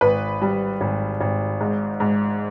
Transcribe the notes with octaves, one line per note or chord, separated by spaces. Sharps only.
G#1 B4
G3
G#1
G#1
G#2
G#2